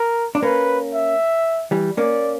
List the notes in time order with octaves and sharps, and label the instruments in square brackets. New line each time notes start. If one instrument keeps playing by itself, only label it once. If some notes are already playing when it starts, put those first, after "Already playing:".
Already playing: [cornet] A#4
[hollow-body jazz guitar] D4
[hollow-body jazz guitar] A#3 C#4 [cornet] B4
[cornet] E5
[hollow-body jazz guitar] E3 G3
[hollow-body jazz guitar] A#3 C#4 [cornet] D5